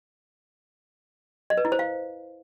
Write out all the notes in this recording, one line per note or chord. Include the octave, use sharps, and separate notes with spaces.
D#5
B4
E4
C5
F5